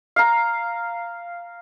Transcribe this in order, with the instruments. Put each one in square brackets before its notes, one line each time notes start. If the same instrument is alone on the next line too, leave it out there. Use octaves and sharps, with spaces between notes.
[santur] F5 A#5